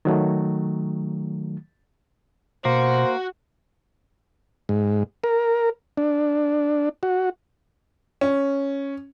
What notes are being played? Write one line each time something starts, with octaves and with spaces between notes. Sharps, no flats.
D#3 F#3 A3
B2 A#3 F#4 C5
G#2
A#4
D4
F#4
C#4